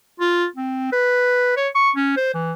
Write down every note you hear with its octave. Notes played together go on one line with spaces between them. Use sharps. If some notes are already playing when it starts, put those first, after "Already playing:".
F4
C4
B4
C#5
C#6
C#4
C5
E3